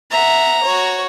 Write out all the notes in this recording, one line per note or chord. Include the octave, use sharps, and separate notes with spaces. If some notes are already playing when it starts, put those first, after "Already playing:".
E5 F#5 A#5
F#4 C#5